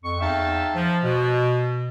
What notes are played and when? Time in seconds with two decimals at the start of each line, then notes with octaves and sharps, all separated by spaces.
0.04 F2 C#6
0.21 E2 D#4 E5 F5 G5 A5
0.74 F3
1.04 B2